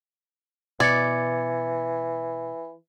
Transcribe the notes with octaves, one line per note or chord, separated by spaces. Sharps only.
B2 E3 D5 G#6 A6 C#7